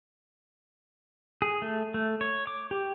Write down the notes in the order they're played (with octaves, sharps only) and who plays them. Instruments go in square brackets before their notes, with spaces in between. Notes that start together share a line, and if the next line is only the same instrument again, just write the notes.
[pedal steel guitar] G#4
A3
A3
C#5
D6
G4